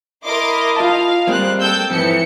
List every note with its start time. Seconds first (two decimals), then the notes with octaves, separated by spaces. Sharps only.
0.25 E4 A#4 D#5 C6 D6
0.76 F4 F5 A5
1.27 G3 G#3 A#3 C4 F#6
1.60 A4 G5 E6 G6
1.90 F2 G#2 E3 C4 C#7